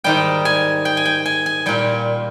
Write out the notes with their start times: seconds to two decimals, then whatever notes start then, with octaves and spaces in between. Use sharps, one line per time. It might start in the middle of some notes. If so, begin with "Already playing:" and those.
0.04 G#2 D#3 G3 G5
0.45 G#5
0.85 G5
0.97 G#5
1.05 G5
1.25 G#5
1.46 G#5
1.66 A#2 G3 G5